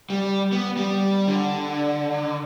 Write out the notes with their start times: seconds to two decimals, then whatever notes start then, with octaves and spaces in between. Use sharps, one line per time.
0.10 G3
0.52 B3
0.77 G3
1.28 D3